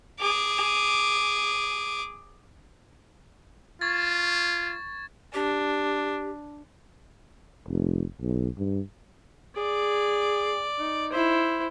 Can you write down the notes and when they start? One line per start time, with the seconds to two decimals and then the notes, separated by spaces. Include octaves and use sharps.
0.20 G#4 D6
3.81 F4 C#6 G#6 A6
5.34 D4 G4
7.68 F1
8.21 B1
8.58 G2
9.57 G#4 D5
10.79 D#4
11.12 E4 C5